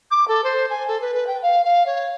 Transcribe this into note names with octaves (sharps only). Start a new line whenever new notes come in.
D6
A4
C5
G#5
A4
B4
B4
G5
F5
F5
C#5